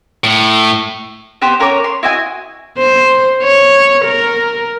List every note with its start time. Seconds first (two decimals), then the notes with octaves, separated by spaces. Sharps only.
0.24 A2
1.42 B3 G4 C5
1.60 C#4 A#4 C#5 D6
1.84 C6
2.03 E4 F#4 D#5 G#5
2.78 C5
3.44 C#5
4.05 A#4